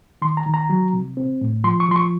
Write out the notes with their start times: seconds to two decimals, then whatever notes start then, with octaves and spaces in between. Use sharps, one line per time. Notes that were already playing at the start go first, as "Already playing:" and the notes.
0.22 D#3 C6
0.37 A#5
0.46 D#3
0.54 A#5
0.69 F#3
0.93 C3
1.17 C4
1.41 A2
1.64 F3 C6
1.80 C#6
1.88 F3 C6
1.96 C#6